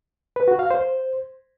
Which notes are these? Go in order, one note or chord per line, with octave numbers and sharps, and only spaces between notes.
B4
F#4
F5
C5